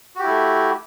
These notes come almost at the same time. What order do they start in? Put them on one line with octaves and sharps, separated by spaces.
F#4 G4 E4 A3